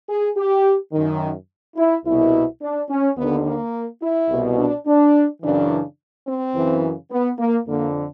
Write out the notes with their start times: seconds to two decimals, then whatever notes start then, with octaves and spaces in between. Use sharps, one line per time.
0.09 G#4
0.37 G4
0.92 F#2 D#3
1.77 E4
2.06 C2 B2 E4
2.62 D4
2.90 C#4
3.17 D#2 D3 B3
3.46 A#3
4.02 E4
4.29 C2 B2
4.58 D4
4.87 D4
5.42 F#2 C#3 E3 D4
6.27 C4
6.55 F#2 C#3 E3
7.11 B3
7.39 A#3
7.67 F2 D3 A#3